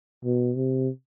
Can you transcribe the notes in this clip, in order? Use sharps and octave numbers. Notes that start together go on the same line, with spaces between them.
B2
C3